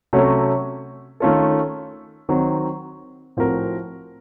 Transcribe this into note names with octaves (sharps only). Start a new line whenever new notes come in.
C3 F#3 A3 C#4 F#4
D#3 A3 C#4 F4 A4
D#3 F#3 C4
A2 F3 C4 F#4 A#4